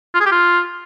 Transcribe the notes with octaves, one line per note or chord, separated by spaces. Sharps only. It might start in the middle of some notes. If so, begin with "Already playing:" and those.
F4
G#4
G4
F4